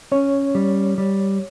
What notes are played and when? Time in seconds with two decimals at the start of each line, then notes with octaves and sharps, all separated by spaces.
0.12 C#4 C#5
0.55 G3
0.98 G3